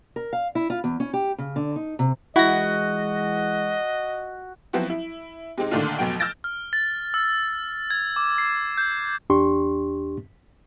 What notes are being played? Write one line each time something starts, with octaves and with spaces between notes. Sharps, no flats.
A#4
F5
E4
F4
E2
C#4
G4
C#3
D3
D#4
C3
E3 G#3 E4 F#4 D#5 A#6
F3 F#3 B3 C4 E4 F#4
E4
C3 G#3 C4 D#4
A#2 D3 D#3 A3 D4 F4
F1 B2 F#3 G5
E6 F6 G6 A6 A#6 D7
F6
A6
E6
G#6
D6
C7
G6
E2 D4 G4 C6 C#6